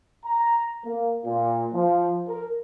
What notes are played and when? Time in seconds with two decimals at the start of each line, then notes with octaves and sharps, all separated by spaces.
0.26 A#5
0.85 A#3
1.26 A#2
1.74 F3
2.28 A#4